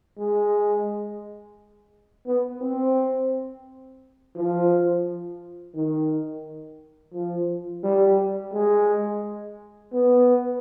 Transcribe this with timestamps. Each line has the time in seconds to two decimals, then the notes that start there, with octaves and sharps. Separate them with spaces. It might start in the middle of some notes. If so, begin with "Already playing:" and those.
0.18 G#3
2.26 B3
2.61 C4
4.35 F3
5.75 D#3
7.14 F3
7.83 G3
8.53 G#3
9.93 B3